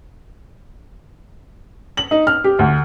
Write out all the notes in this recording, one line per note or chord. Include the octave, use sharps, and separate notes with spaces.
F#7
D#4
F6
G4
D2